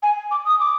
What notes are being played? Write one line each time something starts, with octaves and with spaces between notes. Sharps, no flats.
G#5
D6
D#6
D6